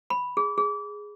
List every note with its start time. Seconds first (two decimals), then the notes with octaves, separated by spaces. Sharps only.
0.10 B5
0.37 G#4
0.58 G#4